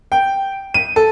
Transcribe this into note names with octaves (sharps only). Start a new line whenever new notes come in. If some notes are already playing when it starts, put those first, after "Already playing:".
G5
D#7
A4